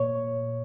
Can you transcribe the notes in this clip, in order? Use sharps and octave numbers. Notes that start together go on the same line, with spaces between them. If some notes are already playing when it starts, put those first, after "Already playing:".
Already playing: A#2 C#5